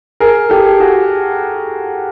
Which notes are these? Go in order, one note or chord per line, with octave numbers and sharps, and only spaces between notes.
G#4 A#4
G4 A4
F#4 G#4